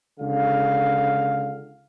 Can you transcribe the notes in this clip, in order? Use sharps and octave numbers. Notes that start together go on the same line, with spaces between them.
C#2 D3 F5